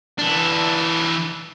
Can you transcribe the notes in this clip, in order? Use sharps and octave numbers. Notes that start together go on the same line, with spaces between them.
E3 D4